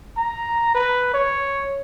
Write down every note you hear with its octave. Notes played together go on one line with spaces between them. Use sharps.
A#5
B4
C#5